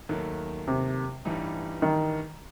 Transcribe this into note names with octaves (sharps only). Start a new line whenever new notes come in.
D#2 D#3 F#3 A3
C3
A1 G2 E3 G3 D#4
D#3